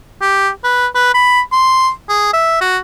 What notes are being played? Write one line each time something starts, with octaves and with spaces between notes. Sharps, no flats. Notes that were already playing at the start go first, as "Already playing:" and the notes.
G4
B4
B4
B5
C6
G#4
E5
F#4